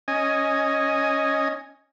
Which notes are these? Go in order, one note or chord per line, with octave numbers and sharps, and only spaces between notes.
C#4 D#5 G#5